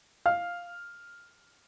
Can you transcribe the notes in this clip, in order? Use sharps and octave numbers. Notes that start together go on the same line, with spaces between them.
F5 F6